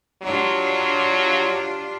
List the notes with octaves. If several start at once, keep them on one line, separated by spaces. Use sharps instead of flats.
F#3 D4 F4 G4